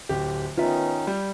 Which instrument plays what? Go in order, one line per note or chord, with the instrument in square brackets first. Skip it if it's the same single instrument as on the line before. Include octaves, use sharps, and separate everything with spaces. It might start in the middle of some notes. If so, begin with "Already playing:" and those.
[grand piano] D1 G4
[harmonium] D#3 C#4 D#4 [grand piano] B3 [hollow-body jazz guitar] F4 E5
[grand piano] G3